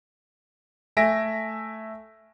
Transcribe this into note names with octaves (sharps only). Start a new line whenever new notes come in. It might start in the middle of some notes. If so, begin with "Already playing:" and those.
A3 E5 G#5 A#6 D7